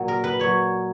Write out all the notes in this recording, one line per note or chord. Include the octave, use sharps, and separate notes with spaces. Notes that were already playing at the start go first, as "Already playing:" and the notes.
Already playing: A#2 F#3
A#4
B4
A#2 F#3 C#5